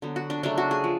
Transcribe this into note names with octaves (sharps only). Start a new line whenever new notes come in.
D3 F#3 B3
F#4
D4
C#3 F#3 A3 D4
F#4
G#4
F3